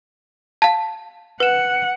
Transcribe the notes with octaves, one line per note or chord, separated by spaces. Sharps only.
F5 A5
B4 F#5 E7